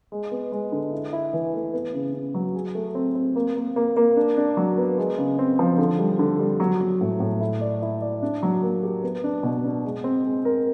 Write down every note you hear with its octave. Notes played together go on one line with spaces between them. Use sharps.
G#3
B3
G#3
D3
E4
E4
E3
A3
B3
C#3
C#3
F#3
G#4
A3
C4
C4
A#3
A#3
A#3
A#3
D4
D4
F#3
B3
G#3
C#3
C4
F3
D3
G3
D3
G3
F#3
F#3
A2
A2
E4
D5
E4
D5
D4
F#3
A#3
G4
B3
D4
B2
D4
G#3
C4
G#3
A#4